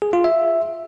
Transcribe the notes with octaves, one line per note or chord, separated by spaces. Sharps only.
G#4
F4
E5